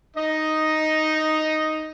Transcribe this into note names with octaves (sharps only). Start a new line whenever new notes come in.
D#4 D#5